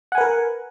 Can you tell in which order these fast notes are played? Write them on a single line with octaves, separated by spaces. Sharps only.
F#5 G#5 B4 A#4